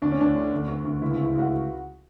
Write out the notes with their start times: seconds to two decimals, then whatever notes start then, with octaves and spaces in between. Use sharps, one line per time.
0.02 D2 D4
0.12 C#4
0.19 D2 D4
0.35 D3
0.52 D2
0.68 D2
0.85 D2
1.01 C#2 E4
1.14 E4
1.18 C#3
1.26 E4
1.35 C#2 F#4